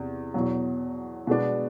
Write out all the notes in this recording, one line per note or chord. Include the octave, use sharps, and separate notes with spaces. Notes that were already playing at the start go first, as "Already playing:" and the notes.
Already playing: E2 C3
E2 B2 F#3
B2 G#3 B3 D4